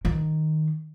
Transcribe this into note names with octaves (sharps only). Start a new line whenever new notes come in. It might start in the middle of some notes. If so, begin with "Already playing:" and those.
D#3